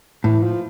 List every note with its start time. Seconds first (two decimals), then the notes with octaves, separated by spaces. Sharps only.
0.24 A2 E3
0.43 F3